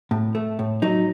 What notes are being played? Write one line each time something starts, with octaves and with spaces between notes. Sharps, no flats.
A2
A3
A2
F#3 D#4